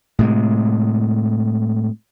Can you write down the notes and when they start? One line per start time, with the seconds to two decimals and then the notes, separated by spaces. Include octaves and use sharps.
0.19 A2 C3 G#3